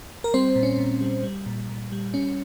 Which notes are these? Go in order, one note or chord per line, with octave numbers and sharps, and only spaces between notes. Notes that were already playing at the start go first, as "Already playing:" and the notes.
A#4
G3 C4 C5
A#2
C#4
A#2
G3
G3
A#2
A#2
G3
G3 C#4